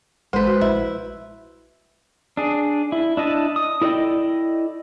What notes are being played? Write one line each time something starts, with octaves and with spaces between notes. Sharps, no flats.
A1 G#3 B4 C5
F#4
A#1 E4
D4 G#4
E4
D4 E4 D#5 A5
D#6
E4 A4 D5 D#5 G5